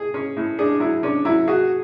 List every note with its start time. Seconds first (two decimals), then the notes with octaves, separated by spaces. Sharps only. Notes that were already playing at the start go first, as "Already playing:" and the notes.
Already playing: G#4
0.14 C#4
0.37 A2
0.59 D4 G#4
0.80 F#3 E4
1.03 C#4 D4
1.25 F#3 E4
1.48 F#4 G#4